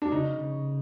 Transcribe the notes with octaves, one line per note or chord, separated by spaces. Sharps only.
D4
C#3 D#4
C#3